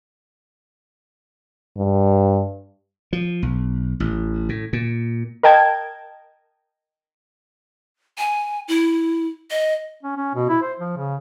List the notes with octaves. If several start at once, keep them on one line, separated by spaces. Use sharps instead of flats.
G2
F3
B1
A1
A2
A#2
A#4 D#5 G5 A5 G#6
G#5
E4
D#5
C#4
C#4
B2
E4
C5
F3
C#3